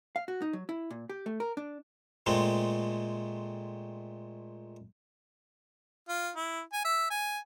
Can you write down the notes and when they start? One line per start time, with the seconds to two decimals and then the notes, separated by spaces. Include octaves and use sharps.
0.16 F5
0.28 F#4
0.42 D#4
0.53 F#3
0.69 E4
0.90 A#2
1.09 G4
1.26 A3
1.40 A#4
1.57 D4
2.26 A#2 G#3 A3 C4
6.08 F4
6.36 E4
6.73 G#5
6.85 E5
7.10 G#5